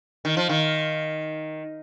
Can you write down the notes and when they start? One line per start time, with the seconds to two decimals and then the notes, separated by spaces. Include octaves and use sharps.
0.25 D#3
0.37 F3
0.49 D#3